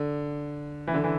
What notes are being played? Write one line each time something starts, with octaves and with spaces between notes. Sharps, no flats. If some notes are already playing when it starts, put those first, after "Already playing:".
Already playing: D3
E3
D3
E3